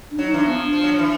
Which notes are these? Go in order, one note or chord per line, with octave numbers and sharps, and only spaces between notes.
D4
F#3 D#4
E3 D4
F3 B3
D4
F3
F#3
F3
E3